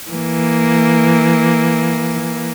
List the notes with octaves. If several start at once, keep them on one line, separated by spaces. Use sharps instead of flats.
E3 A#3